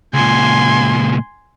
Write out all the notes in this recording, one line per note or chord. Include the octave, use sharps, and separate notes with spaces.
C#2 A#2 G#5 C6